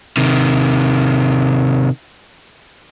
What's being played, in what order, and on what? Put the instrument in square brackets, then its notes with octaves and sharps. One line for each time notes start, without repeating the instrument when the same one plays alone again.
[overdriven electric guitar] C3 D#3